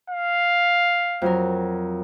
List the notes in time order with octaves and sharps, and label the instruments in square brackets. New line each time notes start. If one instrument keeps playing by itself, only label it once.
[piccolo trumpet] F5
[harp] F2 F#3 A#4